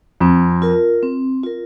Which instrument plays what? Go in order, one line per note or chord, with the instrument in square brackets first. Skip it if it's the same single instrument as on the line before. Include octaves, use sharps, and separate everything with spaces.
[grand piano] F2 [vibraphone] C4
[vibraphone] F4 A#4
C4
F4 A#4